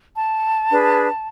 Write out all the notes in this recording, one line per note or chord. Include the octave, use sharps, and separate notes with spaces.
A5
D4 G#4 B4